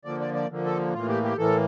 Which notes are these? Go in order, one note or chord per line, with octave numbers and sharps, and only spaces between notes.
D3 F3 A#3 D5
D5
D5
D3 F3 A#3
A4
A2 E3 A#3 F4
G4
G4
A2 E3 A#3 A4